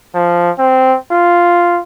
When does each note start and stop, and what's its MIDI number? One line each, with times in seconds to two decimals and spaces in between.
0.15 0.50 53
0.58 0.97 60
1.11 1.81 65